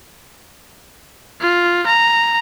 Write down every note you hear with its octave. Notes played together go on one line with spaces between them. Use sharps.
F4
A#5